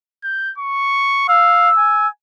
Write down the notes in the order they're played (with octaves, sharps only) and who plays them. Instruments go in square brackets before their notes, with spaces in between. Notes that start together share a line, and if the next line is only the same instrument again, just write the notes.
[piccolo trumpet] G6
C#6
[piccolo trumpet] F5 [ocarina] E6
[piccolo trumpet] G#5